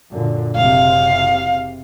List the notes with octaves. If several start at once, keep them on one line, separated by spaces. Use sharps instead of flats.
F#2 A#2 D3
F#1 C3 F5